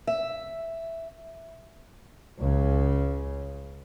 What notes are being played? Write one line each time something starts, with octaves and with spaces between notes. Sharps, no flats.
E5
C#2 C#3